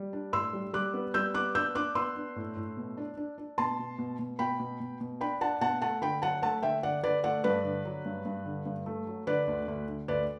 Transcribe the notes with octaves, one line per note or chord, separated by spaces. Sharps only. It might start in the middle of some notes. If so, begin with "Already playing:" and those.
Already playing: G3
D4
A2 C6 E6
G3
G3 D6 F#6
B3
G3 E6 G6
B3 D6 F#6
D4 E6 G6
D4 D6 F#6
B3 C6 E6
D4
A2
A2
B2
D4
D4
D4
B2 A5 C6
B2
B2
B2
B2 G5 B5
B2
B2
B2
D4 G5 B5
D4 F#5 A5
B2 F#5 A5
A3 F#5 A5
D3 G5 B5
F#3 F#5 A5
A3 F#5 A5
D3 E5 G5
D3 D5 F#5
D3 B4 D5
A3 D5 F#5
G2 B4 D5
D3
F#3
G2
G2
D3
G2
A3
F#3
D3 B4 D5
D2
D2
D3
D2 B4 D5